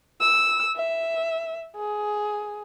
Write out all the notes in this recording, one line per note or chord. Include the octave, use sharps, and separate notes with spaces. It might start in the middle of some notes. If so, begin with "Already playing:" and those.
E6
E5
G#4